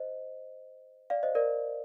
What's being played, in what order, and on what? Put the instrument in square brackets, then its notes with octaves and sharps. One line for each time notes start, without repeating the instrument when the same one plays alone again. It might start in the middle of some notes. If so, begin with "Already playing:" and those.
Already playing: [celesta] C5 D#5
D5 F5
C5 D#5
A#4 D5